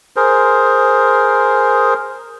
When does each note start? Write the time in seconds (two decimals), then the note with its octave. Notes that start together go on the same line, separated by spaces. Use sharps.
0.16 G#4 A#4 C5